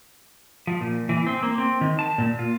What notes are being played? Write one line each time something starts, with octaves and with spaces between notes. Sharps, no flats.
F3
A#2
E3
C4
A#3
C4
D#3
A5
A#2
F4